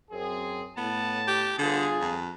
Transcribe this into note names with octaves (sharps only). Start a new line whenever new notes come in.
F#2 C4 G#4
A2 B3 A5
G4
G1 D3 F4 G#4
F2